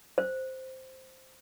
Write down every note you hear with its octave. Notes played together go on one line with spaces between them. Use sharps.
C5